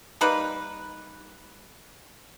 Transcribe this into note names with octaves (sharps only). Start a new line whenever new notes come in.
G3 A#3 D#4 B4